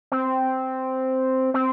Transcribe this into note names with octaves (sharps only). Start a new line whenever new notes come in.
C4
C4